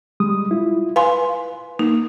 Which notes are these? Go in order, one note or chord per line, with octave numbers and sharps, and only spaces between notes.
G3 G#3 D#6
E4 F4
B4 F5 G#5 C6
A#3 D#4